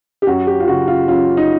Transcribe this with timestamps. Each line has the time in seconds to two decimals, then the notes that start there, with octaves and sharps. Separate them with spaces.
0.22 G4
0.27 F#2 F#4
0.47 G4
0.60 F4
0.68 C#3 F#3 F#4
0.88 F4
1.08 F#2 F4
1.37 D#4